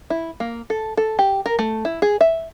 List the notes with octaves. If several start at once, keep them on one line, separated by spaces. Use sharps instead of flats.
E4
A#3
A4
A4
G4
A#4
A3
E4
G#4
E5